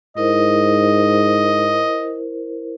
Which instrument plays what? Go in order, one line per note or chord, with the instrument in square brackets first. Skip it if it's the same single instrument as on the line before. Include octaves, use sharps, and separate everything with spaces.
[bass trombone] G#2 [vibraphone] E4 A#4 C5 [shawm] D#5